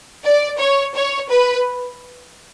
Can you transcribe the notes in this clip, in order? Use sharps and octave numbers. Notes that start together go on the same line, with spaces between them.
D5
C#5
C#5
B4